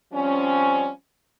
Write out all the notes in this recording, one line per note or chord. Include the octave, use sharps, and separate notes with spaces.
F3 G3 C4 C#4